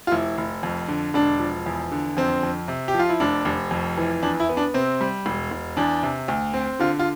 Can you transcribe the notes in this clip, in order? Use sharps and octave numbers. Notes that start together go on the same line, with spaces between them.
F4
F1 E4
F1
F2
D3
E1 D4
F3
E2
D3
F2 C4
F2
C3
G4
F3
F4
E4
F1 D4
F1
F2
E3
E2 D4
E4
B3
D4
C3 C4
G3
E1
E1
E2 D4
C3
D2
C4
D3 F4
F4